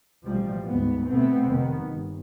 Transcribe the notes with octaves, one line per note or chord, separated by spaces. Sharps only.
A1 B2 F3 G3
D2 G#2 B3
B2 A3 B3 C4
F1 D#3 B3
G1